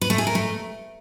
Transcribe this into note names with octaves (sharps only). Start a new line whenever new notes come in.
B4
A3
G#4
A#4
A3